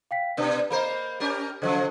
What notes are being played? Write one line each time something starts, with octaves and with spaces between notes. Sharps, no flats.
F5 G5 B6
B2 D4 B4
A#3 A#4 C5 D#5 B5
C#4 G4 A#4
C#3 F3 F#3 A4 C5 D#5